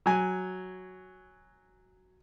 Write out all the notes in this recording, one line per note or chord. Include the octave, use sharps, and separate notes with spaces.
F#3 G#5